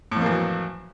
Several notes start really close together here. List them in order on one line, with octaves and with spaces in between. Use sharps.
A2 F2 A#3 E3 F#3